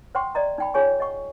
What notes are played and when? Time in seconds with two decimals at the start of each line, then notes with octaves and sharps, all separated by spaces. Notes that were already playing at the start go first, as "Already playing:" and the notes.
0.15 C5 F#5 G5 C6 C#6
0.35 D5 D#5 A#5
0.58 D#4 G5 B5
0.74 F4 G#4 C#5 G#5 C#6
1.00 D#5 F#5 C#6